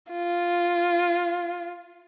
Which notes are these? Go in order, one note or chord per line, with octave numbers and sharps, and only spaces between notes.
F4